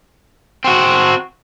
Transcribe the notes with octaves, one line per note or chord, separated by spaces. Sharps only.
C4 F#4